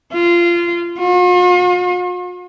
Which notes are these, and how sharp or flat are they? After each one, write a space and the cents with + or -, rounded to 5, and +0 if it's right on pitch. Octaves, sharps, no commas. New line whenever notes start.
F4 -20
F4 +45